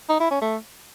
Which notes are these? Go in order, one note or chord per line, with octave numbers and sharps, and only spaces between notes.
D#4
E4
C#4
A3